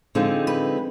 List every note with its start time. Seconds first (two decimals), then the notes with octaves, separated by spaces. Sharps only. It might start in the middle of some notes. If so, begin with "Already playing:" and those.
0.15 D3 F3 G#3 C4 D#4
0.47 B4